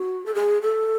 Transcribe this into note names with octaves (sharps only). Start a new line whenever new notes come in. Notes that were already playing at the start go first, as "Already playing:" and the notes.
Already playing: F#4
A4
G#4
A4